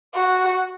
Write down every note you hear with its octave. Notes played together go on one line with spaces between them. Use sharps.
F#4